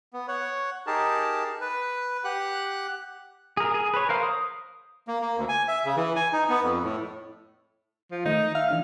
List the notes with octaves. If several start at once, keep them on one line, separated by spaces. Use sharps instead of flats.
B3
C#5 F#5
D#4 G4 G#4 A#4 A5
B4
G4 F#5 F#6
G#4 A#4
G#4
B4 C#5
A#4 C5 F5
D#6
A#3
A#3
D2
G#5
E5
C#3
E3
G#5
D#4
B3
F2
A2
F3
D#3 A3 D#4
E5 F5
E3 D4 F6